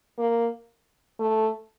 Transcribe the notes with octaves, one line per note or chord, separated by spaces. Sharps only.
A#3
A3